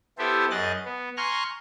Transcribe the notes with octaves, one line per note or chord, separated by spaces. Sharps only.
B3 E4 G4 A4 C5 E5
F#2 G#4 D#5 F#6 A6
B3
G#5 A#5 C6 C#6 F6 F#6